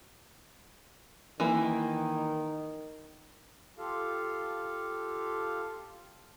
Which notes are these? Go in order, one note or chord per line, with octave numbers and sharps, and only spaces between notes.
D#3 E3 A#3
F4 G4 A4 F5